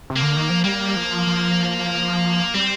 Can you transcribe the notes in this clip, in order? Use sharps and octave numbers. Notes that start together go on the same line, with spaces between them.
C3
A#3
D3
D#3
F3
G3 A#3
F3
F3
G3 C4